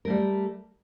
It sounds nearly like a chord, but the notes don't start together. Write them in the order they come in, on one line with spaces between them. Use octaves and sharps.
A#4 A3 G3